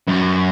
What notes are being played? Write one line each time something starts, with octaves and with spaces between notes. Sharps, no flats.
F#2